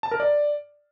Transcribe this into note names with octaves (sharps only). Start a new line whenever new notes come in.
A5
A#4
D5